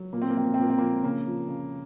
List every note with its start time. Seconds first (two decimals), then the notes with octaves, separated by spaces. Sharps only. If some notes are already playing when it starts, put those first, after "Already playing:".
Already playing: F#3
0.13 A#2 A#3
0.22 C4
0.30 A#3
0.36 F3 C4
0.45 A#3
0.54 C4
0.58 A#2 A#3
0.70 C4
0.78 F3 A#3
1.04 C#3 A#3
1.27 F3
1.48 C#3